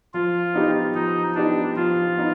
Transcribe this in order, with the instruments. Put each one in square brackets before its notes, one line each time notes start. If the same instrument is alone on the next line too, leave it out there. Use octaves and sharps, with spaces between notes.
[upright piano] F3 [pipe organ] F4
[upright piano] B3 D#4 G4
[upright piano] F3 [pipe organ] D#4
[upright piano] B3 D#4 G4 [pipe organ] D4
[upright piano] F3 [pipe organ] F4
[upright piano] B3 D#4